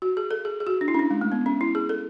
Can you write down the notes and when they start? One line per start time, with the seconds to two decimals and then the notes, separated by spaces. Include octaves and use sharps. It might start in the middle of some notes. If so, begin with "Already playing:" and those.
0.02 F#4
0.17 G#4
0.31 A4
0.45 G#4
0.60 G#4
0.67 F#4
0.81 D4
0.88 E4
0.94 C#4
0.99 D4
1.10 G#3
1.21 A3
1.32 B3
1.46 C#4
1.61 E4
1.75 G#4
1.89 A4